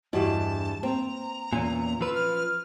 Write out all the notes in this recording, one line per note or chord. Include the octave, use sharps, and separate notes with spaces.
E2 G2 F#4 G4 D#5 A5
A#3 C4 G5 A#5
E2 A#2 C#4 G#5
F3 C#4 B4 E6
F6